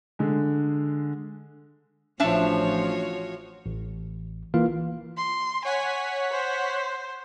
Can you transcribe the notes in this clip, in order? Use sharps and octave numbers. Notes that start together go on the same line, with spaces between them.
D3 G#3
A1 F3 D4 F4 F#4 C#5 E5 A5
A1
E3 A#3 F4 F5
C6
C#5 F#5 G#5 B6
C5